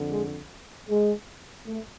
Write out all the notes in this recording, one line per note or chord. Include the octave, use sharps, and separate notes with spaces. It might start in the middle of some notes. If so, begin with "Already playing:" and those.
Already playing: F2 D3
G#3
G#3
A3